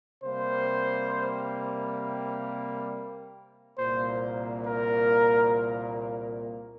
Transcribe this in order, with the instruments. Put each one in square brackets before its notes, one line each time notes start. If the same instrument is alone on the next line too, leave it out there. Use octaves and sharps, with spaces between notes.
[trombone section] C3 G3 A#3 [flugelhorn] C5
[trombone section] C2 A#2 A#3 [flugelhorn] C5
[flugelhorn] A#4